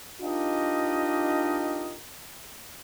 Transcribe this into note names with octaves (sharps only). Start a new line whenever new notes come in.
D4 D#4 F4 G4 A#4 D#5